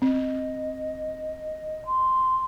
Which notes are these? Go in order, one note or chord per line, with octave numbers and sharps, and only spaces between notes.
C4 D#5
C6